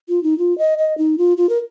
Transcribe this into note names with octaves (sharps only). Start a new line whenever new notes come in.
F4
D#4
F4
D#5
D#5
D#4
F4
F4
A#4